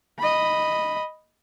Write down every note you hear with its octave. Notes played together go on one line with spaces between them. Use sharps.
D#5 B5